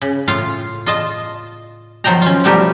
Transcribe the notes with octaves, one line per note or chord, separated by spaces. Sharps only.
C#3
A2 F4 F5
F4 D#5 A5
D#3 F3 F#3 G5 A#5
C#4 F4
B2 F3 G3 A3 G4 A#4